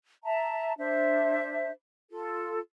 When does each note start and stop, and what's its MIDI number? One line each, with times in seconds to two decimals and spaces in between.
0.25 0.73 76
0.25 0.73 81
0.25 0.73 82
0.78 1.71 62
0.78 1.71 72
0.78 1.71 76
2.10 2.59 65
2.10 2.59 69